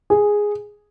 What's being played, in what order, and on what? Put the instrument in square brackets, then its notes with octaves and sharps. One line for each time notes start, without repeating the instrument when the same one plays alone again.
[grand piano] G#4